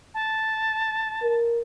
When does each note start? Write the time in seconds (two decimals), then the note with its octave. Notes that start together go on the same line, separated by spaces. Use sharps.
0.14 A5
1.23 A#4